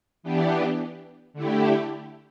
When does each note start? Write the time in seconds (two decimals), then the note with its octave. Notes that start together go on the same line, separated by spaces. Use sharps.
0.23 E3 B3 D4 G4
1.33 D3 A3 E4 G4